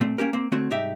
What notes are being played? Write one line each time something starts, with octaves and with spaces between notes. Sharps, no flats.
A#2 A3 C4
A#3 C#4 G4 A#4
A#3 C4
D3 A3 C4 F#4 C#5
C2 G#2 D#4 G4 E5